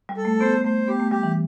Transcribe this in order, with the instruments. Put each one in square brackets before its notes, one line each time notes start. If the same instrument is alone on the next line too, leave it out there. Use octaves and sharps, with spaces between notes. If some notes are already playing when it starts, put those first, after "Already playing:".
[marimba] G3
[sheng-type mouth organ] A4
[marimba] A3
[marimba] B3 [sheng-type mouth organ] C5
[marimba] A3 [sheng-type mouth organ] C5
[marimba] B3 [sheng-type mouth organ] G4
[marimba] A3
[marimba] G3 [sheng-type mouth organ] G4
[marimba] E3